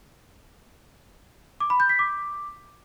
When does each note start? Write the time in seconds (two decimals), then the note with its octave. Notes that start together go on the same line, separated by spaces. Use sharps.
1.60 D6
1.70 B5
1.80 G6
1.89 B6
1.99 D6